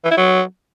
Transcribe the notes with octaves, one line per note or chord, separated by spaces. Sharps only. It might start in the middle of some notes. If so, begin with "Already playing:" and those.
E3
E4
F#3